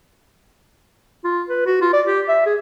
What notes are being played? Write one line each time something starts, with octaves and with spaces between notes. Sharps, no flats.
F4
B4
F#4
F4
D5
G4
E5
G#4